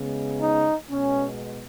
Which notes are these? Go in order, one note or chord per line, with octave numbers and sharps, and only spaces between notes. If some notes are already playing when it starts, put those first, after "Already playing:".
Already playing: C#3 G#3 B3
D#4
B2 G#3 B3 C#4